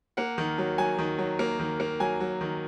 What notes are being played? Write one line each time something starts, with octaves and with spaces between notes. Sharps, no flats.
A#3 F#5
D#3
F#3
F#3 G#5
D#3
F#3
A#3
D#3
A#3
F#3 G#5
F#3
D#3